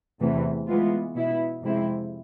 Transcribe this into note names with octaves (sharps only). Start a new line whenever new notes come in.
E2 C3 E3 A3
E3 G#3 B3 F4
B2 B3 E4
F2 C3 G#3 C4 E4